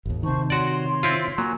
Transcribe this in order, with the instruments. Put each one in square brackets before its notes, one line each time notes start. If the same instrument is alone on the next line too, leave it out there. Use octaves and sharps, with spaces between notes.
[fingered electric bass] G#1 D#2
[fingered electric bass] C3 D#3 [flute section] C5 A5 C#6
[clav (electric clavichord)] F#4 D5 [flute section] C#5 C6
[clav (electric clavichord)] C4 E4 F4
[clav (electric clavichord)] F#3 [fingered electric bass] A#3 [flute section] F4 G#5